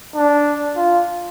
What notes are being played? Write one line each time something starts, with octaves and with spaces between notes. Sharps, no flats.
D4
F4